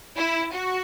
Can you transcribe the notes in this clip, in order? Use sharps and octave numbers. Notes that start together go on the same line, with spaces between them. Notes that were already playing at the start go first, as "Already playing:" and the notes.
E4
F#4